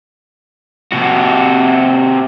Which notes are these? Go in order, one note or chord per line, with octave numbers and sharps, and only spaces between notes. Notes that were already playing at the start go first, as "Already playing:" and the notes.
C3 F#4